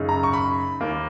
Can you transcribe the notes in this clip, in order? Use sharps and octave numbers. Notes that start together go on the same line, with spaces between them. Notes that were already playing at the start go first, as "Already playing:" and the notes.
Already playing: F#2 C#3 G#3 D#4
A#5
C#6
B5
D#2 D#3 A#3